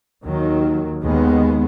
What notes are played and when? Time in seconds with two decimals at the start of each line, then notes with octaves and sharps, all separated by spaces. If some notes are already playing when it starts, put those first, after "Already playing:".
0.24 D#2 D#3 F#3
1.03 D#2 D#3 G#3 B3